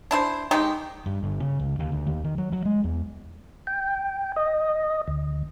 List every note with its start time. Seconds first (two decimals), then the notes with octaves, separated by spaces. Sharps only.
0.11 D4 E4 C5
0.51 D#3 G#3 D#4 G4
1.06 G2
1.22 G1
1.40 C#3
1.60 C#2
1.79 D#2
1.92 D2
2.06 D#2
2.24 D#3
2.38 F#3
2.53 F#3
2.65 G#3
2.84 E2
3.67 G5
4.36 D#5
5.08 D2